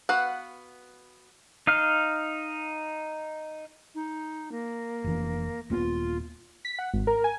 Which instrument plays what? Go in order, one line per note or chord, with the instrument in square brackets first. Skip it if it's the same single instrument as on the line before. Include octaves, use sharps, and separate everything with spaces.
[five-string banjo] B3 F#4 B4 F5 F#5
[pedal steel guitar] D#4 F5 F6
[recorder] D#4
A#3
[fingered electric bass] F1 E3
[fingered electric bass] D#1 A#3 B3 [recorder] F4
[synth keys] B6
F#5
G#1
A#4
G#5